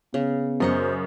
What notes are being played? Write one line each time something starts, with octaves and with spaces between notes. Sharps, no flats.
C#3 B3
F#2 A#4 C5 D#5 C#6